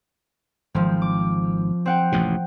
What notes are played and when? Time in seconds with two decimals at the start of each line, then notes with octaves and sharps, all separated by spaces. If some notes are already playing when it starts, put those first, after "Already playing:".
0.74 G#1 F3 C4
1.02 D6
1.86 C4 F#5 G5
2.12 A1 D#2 C3